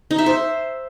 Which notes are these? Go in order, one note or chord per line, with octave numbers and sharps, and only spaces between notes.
D#4
E5
C5